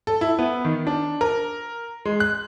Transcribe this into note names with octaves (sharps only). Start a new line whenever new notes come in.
A4
E4
B3
D#3
D4
A#4
G#3
F#6